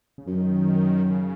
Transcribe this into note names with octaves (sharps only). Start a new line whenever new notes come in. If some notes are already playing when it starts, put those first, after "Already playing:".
C#3
F#2 D#3
D#3
C#3